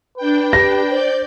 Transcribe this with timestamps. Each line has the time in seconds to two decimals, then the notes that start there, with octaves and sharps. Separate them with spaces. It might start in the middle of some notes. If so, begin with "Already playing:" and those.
0.17 D4 B4 G5
0.53 G4 A#6
0.90 C5 D5 G6